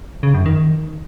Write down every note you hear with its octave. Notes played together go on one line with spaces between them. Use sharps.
C#3
F#2
D#3